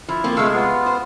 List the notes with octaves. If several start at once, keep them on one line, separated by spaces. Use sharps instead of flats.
F3 E4
F3 A#3 C4
C3 G#3 A3 F5 E6
B3 F4
C5